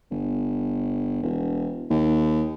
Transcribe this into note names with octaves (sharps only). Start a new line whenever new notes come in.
G1
E1
D#2